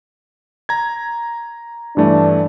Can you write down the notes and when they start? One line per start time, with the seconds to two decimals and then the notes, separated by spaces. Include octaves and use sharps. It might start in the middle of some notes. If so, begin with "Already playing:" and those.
0.69 A#5 G#6
1.97 G2 E3 A3 D4